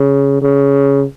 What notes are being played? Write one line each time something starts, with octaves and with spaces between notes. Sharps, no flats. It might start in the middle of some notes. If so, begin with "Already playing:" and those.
Already playing: C#3
C#3